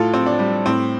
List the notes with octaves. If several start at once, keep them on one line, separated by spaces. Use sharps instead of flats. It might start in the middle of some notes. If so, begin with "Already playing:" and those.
Already playing: A2 F4 A4
C4
D4
G3
A2 C4